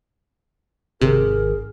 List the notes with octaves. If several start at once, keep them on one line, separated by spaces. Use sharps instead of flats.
G#1 C3 G#4 A#4